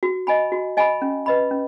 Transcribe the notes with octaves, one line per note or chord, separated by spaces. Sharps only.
F#4
D#5 G#5 B5
F#4
D#5 G#5 B5
C#4
B4 D#5 B5
C#4